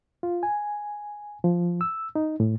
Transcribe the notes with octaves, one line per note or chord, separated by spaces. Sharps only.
F4
G#5
F3
E6
D#4
A2